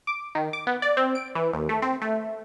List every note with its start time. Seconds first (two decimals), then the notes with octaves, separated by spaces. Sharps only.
0.07 D6
0.35 D#3
0.53 D6
0.67 B3
0.82 D5
0.97 C4
1.15 D7
1.35 E3
1.53 D#2
1.69 A3
1.82 C4
2.02 A3